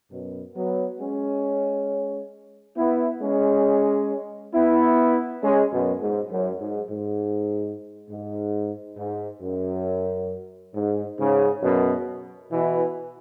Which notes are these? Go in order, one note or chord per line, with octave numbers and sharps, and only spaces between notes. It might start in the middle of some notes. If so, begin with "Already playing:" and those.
F#2 B2
F#3 B3
G#3 C#4
B3 E4
G#3 C#4
B3 E4
G#3 C#4
F#2 B2
G#2
F#2
G#2
G#2
G#2
G#2
F#2
G#2
G#2 C#3
F#2 B2
B2 E3